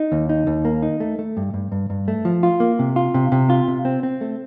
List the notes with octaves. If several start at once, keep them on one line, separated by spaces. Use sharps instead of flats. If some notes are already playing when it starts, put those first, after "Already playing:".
Already playing: D#4
D#2
D#4
D#2
A#3
D#4
A3
A3
G2
G2
G2
G2
A3
F3
F4
A#3
C3
F4
C3
C3
F4
C3
C4
C4
A3